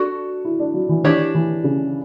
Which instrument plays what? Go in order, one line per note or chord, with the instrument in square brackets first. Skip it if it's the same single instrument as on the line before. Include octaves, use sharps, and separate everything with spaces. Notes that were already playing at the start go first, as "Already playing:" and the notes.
Already playing: [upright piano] D4 [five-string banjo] F#4 A4
[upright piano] E4
D4
F#3
E3
[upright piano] E3 [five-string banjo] D4 G4 C#5
[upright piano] E3
C#3